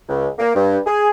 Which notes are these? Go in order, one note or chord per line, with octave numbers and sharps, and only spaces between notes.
C#2
A#3
G2
G#4